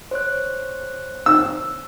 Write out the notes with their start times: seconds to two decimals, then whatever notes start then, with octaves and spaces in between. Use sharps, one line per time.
0.11 C5 C#5 F#6
1.26 E6